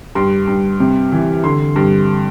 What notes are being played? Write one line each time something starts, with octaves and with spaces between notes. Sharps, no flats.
G2 C6
G2
C3
E3
D3 C6
G2